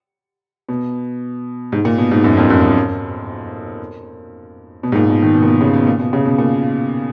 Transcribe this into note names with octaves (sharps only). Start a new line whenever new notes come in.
B2
G#2
A#2
B2
G#2
F#2
F2
F#2
F#2
B2
G#2
A#2
B2
D#3
B2
A#2
B2
C#3
B2
A#2
B2
C#3
B2
A#2